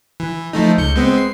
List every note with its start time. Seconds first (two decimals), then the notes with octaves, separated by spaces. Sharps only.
0.20 E3
0.53 F3 A3 D#4
0.77 C#2 G6 C#7
0.96 G#3 B3 C4
1.18 C7